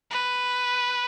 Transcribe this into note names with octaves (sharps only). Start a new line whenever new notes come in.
B4